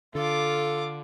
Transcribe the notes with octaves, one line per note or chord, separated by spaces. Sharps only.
D3 F4 A4 D6